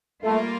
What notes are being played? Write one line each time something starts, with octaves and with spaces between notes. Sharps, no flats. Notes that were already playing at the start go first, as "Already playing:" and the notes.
G3 A3 A#3 F4